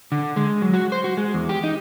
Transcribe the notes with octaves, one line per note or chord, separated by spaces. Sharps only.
D3
G#3
F#3
F#4
C5
F#4
G#3
E2
G4
D#4